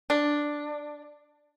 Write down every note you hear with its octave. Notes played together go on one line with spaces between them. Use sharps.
D4